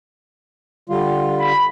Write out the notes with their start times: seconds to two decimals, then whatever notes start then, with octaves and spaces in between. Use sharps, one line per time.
0.89 D3 G3 F4
1.39 B5